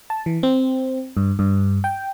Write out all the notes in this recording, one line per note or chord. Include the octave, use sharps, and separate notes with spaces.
A5
E3
C4
G2
G2
G5